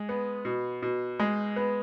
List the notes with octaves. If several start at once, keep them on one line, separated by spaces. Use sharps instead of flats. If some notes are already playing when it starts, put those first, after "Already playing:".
Already playing: G#3
B3
B2
B2
G#3
B3